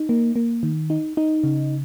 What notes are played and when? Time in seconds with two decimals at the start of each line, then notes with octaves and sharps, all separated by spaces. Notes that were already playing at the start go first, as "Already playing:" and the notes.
Already playing: D#4
0.09 A#3
0.36 A#3
0.63 D#3
0.90 D#4
1.17 D#4
1.44 C#3